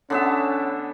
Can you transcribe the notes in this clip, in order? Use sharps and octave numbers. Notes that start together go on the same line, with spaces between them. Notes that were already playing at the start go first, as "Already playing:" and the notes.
D3 B3 C#4 E5